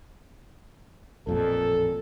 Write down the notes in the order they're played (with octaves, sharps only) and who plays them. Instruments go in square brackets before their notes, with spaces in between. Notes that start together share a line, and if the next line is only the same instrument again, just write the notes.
[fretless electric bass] A1 F2 A#2 [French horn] A4